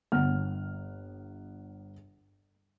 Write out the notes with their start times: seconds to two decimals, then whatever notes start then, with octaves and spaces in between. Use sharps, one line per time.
0.12 G1 F#5 F6